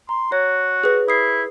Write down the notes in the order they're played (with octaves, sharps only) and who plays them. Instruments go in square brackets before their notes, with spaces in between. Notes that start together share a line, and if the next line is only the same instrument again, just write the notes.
[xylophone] A#5 [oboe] C6
[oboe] F#4 [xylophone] C#5
[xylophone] G#4 B4
[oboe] E4 [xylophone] D#6 C7